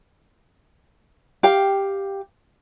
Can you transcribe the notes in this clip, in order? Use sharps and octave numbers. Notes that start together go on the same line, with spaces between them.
G4 F5 G5